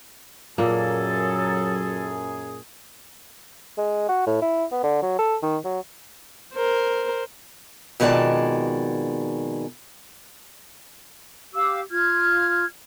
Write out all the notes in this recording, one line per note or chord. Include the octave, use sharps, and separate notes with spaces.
F#2 A#2 F#3 A#3 G#4 A4
G#3
F#4
A2
E4
B3
D3
F#3
A4
D#3
F#3
A#4 C5
F2 B2 D#3 G#3 D5 A5
G4 F5 D6 E6
F4 F6 G#6